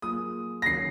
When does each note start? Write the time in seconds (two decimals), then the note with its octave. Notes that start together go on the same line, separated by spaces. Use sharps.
0.02 F#3 A#3 F4 G#4 D#6
0.62 A#6
0.66 D#3 F#3 C#4 F#4 C7